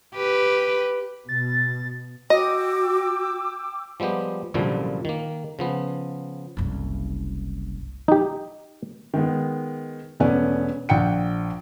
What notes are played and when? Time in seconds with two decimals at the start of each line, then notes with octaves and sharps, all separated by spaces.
0.15 G4 B4
1.29 B2 A6
2.30 F#4 D#5 G5 D6 E6
4.00 F3 G3 G#3 B3 G4
4.54 C2 F#2 A#2 D3 F3 G3
5.05 D#3 A#3
5.59 C#3 F3 B3
6.57 F#1 C2
8.08 D#4 G4
9.14 D#3 G#3 B3
10.20 E1 A3 B3 C#4 D5 G#5
10.89 A#1 F#5 G5 C#7